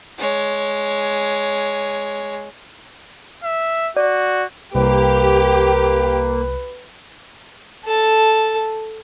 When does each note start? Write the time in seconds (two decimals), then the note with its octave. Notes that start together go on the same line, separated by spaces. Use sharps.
0.18 G#3 C#5
3.44 E5
3.97 F#4 D5
4.75 C2 A#3 G4 B4
7.85 A4 A5